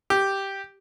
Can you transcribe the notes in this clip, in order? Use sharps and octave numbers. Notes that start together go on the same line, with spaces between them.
G4